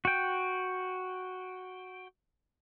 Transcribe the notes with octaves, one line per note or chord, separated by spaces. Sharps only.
F#4 G5